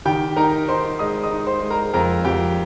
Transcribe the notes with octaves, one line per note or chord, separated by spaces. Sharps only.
D#3 G4 G5
D#4 A#4 A#5
D#4 C5 C6
G#3 D#5 D#6
D#5 D#6
D#4
C5 C6
G#3
A#4 A#5
F2 A#4 A#5
F2 G4 G5